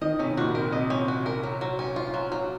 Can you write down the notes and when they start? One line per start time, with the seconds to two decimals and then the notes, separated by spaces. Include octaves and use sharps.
0.01 D#3 D#5
0.19 C3 C#4
0.30 C3
0.37 A#2 F#4
0.54 C3 A#4
0.72 C3 D#5
0.90 C#4
1.08 F#4
1.26 A#4
1.43 F#3
1.61 F#3
1.79 C#4
1.96 F4
2.14 F#3
2.32 F#3